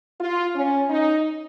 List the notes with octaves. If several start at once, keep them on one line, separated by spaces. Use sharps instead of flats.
F4
C#4
D#4